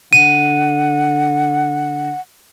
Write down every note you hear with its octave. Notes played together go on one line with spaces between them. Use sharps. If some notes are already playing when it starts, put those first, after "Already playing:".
D3 F#5 D#7